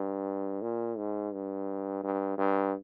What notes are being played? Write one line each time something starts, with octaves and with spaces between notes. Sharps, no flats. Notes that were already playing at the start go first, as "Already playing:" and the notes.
Already playing: G2
A#2
G#2
G2
G2
G2